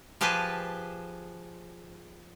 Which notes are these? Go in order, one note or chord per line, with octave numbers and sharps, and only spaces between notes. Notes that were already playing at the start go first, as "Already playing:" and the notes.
F3 G4 G#4 B4 G#5 A5